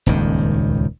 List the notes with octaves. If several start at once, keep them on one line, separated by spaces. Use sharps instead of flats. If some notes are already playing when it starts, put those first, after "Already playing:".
D#1 C#2 G2 D#3